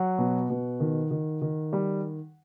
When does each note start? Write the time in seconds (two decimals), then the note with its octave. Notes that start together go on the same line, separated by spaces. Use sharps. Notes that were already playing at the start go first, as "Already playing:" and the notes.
Already playing: F#3 F#5
0.18 B2
0.50 B2
0.80 D#3
1.11 D#3
1.42 D#3
1.73 G3